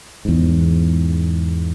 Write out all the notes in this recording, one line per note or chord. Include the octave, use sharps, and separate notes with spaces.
E2 G#2